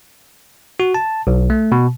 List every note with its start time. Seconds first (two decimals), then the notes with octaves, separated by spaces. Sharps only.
0.80 F#4
0.94 A5
1.27 B1
1.50 A3
1.72 B2